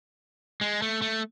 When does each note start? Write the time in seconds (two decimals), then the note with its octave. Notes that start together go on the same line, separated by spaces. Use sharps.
0.61 G#3
0.82 A3
1.02 A3